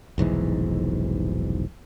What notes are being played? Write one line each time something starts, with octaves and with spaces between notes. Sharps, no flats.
F1 B1 G#2 E3